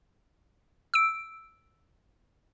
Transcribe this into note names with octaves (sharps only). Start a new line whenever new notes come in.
E6 D7